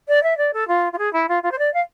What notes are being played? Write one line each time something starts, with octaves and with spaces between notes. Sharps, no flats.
D5
E5
D5
A4
F4
F4
G#4
E4
F4
F4
C5
D5
F5